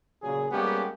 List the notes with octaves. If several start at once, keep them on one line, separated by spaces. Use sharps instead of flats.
A#2 C#3 F#3 G#4
G3 G#3 A#3 B3 C#4 G4